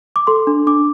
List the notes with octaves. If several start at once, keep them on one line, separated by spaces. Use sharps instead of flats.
D6
A4 C6
D4
D4 D6